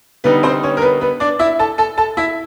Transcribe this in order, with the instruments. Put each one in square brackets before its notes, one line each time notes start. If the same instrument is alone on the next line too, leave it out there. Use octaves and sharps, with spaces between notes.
[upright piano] D3 G3 B3 D#4 B4
C4 C5
C#4 C#5
A#4
B3 B4
B3 B4
D4 D5
E4 E5
A4 A5
A4 A5
A4 A5
E4 E5